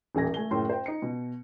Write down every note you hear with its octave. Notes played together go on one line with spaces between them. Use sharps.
D#1 A1 G#5 A#6
A3 G#5 G7
F#1 A2 A3 C#4 G5 C6
C5 G5
D#4 C#7
B2